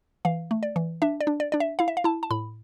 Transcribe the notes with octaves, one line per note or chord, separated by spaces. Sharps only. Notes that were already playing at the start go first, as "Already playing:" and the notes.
E3 F5
A3
D5
E3
D4 E5
D5
D4
D5
D4 D5
E5
E4 F5
E5
F5
E4 A5
A5
A2 B5